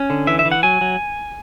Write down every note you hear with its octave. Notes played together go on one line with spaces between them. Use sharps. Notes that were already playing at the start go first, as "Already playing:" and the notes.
Already playing: C#4
D3
E3 E5
E5
E3
F#5
F#3 G#5
F#3